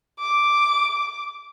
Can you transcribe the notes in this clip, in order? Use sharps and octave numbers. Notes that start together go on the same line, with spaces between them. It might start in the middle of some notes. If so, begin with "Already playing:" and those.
D6